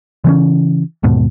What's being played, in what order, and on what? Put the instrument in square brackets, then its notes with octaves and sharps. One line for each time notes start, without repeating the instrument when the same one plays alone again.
[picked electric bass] C#3 E3 C4 C#4
D#2 G#2 B2